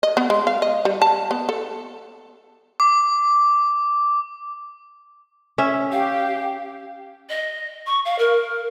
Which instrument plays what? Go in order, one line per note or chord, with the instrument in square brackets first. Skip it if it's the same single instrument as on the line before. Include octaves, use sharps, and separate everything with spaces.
[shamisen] D#5
B3
G#3
F5
D#5
G3
A5
B3
A4
[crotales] D6
[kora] C#4 E5
[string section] G4 [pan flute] F5
[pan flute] D#5
C#6
F5
A#4